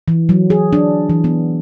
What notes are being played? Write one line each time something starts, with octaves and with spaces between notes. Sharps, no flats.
E3
F#3
G#4
D4
E3
B3